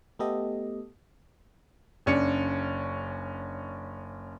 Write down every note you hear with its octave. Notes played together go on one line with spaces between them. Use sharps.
A3 B3 G4 A4 D#5
F#1 C#4 D4 C#7